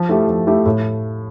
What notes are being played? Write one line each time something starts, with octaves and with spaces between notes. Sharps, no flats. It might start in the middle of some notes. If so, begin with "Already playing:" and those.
Already playing: F3
A3 E4 G4
F3
A3 E4 G4
A2